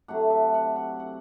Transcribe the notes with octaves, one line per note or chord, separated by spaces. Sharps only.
C3 F#3 A3 D4 F#5
E5
F#5
F#5
F#5